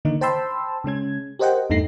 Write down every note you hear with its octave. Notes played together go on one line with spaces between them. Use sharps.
D3 D#3 A#3 D#4
C5 G5 A5 B5 C6 E6
C#3 G#3 C#4 G#6
G4 A#4 C5 D#5 F#5 G5
E2 G2 A3 D#4 A#6 C7